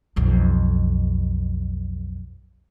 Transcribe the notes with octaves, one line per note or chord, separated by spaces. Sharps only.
B1 F2